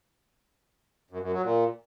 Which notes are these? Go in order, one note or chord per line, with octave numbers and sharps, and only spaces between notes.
F#2
F#2
F#3
A#2